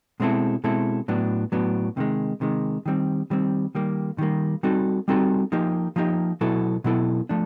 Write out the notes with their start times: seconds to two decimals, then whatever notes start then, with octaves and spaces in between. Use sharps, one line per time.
0.20 B2 G#3 C4 E4 A4
0.64 B2 G#3 C4 E4 A4
1.08 A2 F#3 B3 D4
1.52 A2 F#3 B3 D4
1.97 C3 D#3 G#3
2.41 C3 D#3 G#3
2.86 D#3 G3 C4
3.30 D#3 G3 C4
3.75 D#3 G3 A#3
4.18 D#3 G3 A#3
4.63 G3 C4 D#4 F#4 A4
5.08 G3 C4 D#4 F#4 A4
5.52 F3 A#3 D#4 G4
5.96 F3 A#3 D#4 G4
6.41 B2 F#3 B3 E4 A4
6.84 B2 F#3 B3 E4 A4
7.29 F3 A3 D4